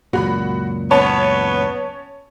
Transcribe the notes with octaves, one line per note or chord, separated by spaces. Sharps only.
C#2 F#2 A#2 F#4 B5
B3 C#4 C#5 A5